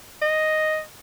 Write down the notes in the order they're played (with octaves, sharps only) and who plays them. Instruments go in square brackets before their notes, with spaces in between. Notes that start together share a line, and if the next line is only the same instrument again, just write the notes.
[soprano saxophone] D#5